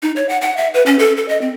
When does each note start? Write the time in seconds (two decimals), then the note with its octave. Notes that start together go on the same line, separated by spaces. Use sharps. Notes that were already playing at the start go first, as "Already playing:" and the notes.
0.03 D#4
0.16 C#5
0.29 F#5
0.41 F#5
0.57 E5
0.74 B4
0.86 C#4
0.99 A4
1.17 A4
1.29 D#5
1.41 C4